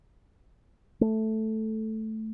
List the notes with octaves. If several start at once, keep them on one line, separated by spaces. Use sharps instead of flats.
A3